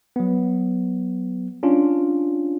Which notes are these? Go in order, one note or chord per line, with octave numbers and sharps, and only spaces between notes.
F#3 B3
C#4 D4 F4